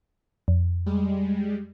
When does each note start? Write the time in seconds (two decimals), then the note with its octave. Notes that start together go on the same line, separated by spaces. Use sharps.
0.48 F2
0.86 G3 G#3